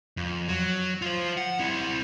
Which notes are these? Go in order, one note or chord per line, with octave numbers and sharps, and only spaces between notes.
F2
F#3
F4 C5
F#5
C4 E4